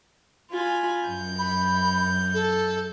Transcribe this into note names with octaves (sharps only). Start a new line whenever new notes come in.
F4 G#5 B5
F#2 G6
B5
A4